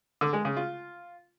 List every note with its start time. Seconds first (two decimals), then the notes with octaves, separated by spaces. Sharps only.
0.21 D3
0.33 G#3
0.45 C#3
0.57 F4